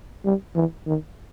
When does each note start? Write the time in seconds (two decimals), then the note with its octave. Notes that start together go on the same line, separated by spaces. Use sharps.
0.25 G3
0.55 E3
0.87 D#3